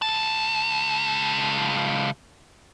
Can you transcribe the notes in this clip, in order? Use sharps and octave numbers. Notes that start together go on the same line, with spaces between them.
C#2 A5